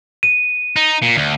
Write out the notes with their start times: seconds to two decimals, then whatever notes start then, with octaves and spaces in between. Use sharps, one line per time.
0.23 D#7
0.76 D#4
1.02 A#2
1.16 D2